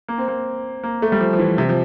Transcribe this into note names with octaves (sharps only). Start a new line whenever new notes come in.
A#3
C4
A#3
A#3
A3
G3
F3
F3
E3
C3
F3